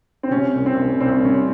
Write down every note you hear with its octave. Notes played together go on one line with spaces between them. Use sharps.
C4
C3 C#4
C2
C4
C2
C2 C4
C3 C#4